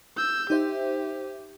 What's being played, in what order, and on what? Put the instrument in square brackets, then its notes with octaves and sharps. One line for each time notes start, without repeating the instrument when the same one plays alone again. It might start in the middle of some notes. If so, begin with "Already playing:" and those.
[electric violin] E6 G6
[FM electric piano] D#4 C5 E5 [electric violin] G4